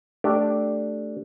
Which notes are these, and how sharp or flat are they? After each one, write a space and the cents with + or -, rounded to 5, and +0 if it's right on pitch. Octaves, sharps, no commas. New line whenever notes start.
A3 +0 D4 +0 G4 -10